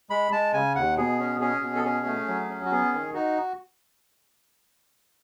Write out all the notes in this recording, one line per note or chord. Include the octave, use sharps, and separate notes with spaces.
G#3 B5
G#3 A5
C#3 G#5
D#2 F#5
B2 G#4
C#4
C#4 G#4
B2
A4
C#4 G#4
A3
F#3
C#4
F#4
B3 G#4
D#3
D#4 F#4